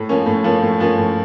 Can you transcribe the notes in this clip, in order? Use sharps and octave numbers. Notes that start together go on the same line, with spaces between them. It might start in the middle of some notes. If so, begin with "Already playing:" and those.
Already playing: A2
F3 A#3 C#4
A2
F3 A#3 C#4
A2
F3 A#3 C#4
A2